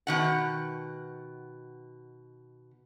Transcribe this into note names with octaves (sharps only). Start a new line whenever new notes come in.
B2 D#3 F#5